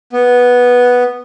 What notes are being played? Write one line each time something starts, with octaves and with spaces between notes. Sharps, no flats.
B3